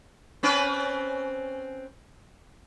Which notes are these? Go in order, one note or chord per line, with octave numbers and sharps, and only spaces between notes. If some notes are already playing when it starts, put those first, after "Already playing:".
C4 C#4 B4